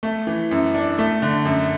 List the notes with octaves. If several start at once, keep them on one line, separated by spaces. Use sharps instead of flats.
A3
E3
F#2
D4
A3
D3
F#2